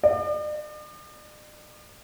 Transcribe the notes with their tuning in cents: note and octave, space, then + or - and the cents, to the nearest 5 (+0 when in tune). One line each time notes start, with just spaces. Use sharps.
D5 +45